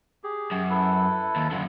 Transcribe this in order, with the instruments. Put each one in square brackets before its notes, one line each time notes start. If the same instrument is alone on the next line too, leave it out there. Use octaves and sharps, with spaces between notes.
[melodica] G4 G#4
[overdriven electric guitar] F#2
[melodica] E4 A4 B4
[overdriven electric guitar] D#2
[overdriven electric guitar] F#2 D3 [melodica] F4